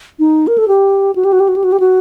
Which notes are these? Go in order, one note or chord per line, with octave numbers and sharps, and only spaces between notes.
D#4
A#4
A4
G4
F#4
G4
F#4
G4
F#4
G4
F#4
G4
F#4